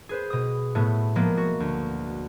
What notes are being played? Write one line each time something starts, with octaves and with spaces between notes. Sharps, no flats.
G#4 B4 C5
B2 D#6
A2 A3 B3
F3 G#3 A#3 B3
F#4
D2